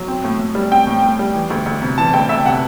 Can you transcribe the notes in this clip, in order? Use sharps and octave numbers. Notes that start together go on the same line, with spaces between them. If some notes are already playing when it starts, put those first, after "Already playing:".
Already playing: F#3
C4
A2
A2
G3
C4 G5
A2
A2
G3
E3
D2
D2
C3
E3 A5
D2 G5
D2 E5
C3 F#5